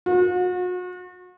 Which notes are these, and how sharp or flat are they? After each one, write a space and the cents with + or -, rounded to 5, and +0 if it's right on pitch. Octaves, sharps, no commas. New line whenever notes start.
F#4 -40